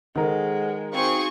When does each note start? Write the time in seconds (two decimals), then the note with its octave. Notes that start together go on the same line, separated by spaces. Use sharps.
0.16 D#3 G#3 A4 A#4 C5 F#5
0.92 C4 D#4 F#4 G#4 F5 C#6